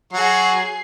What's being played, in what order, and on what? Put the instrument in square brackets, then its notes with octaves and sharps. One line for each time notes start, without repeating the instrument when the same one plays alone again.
[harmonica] F#3 F#4 [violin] G#4 C7